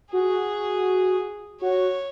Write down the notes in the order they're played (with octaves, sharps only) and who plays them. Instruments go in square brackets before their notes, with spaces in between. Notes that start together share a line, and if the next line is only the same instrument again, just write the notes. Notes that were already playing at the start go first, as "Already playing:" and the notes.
[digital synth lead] F#4 [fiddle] G#4
[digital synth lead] F#4 [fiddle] C#5